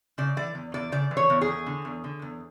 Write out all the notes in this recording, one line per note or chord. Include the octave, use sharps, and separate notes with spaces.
C#3 D5
E3 D5
E2
E2 D5
C#3 D5
E3
C#5
E2
G#4
E2
D3
E2
D3
E2